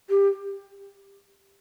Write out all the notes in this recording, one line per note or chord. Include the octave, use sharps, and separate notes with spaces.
G4